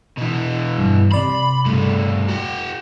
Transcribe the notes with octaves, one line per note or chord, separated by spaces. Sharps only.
B2 E3
G2
C3 D5 B5 C6
G2 A3
F#4 G5